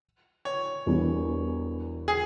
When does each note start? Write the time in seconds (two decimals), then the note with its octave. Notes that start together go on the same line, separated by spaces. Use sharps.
0.45 C#5
0.86 E1 E2 E3 G3
2.08 G#4